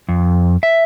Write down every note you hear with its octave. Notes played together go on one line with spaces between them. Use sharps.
F2
E5